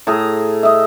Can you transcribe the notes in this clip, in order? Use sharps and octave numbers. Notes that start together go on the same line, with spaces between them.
A2 G#4 A#5
D#5 E5